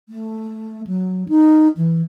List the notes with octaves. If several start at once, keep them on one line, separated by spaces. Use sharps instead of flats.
A3
F#3
D#4
E3